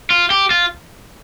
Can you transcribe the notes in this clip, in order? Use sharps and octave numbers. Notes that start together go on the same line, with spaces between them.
F4
G4
F4